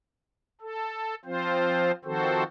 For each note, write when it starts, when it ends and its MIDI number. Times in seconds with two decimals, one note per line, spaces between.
0.61 1.15 69
1.25 1.91 53
1.25 1.91 60
1.25 1.91 65
1.25 1.91 72
2.05 2.43 51
2.05 2.43 53
2.05 2.43 60
2.05 2.43 66
2.05 2.43 69
2.05 2.43 72